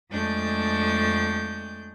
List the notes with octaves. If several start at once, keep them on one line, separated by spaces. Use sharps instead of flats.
F2 G#3 A3 D4 G6